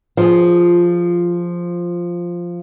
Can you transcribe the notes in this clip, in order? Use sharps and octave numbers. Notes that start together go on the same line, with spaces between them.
F3 F4 G#4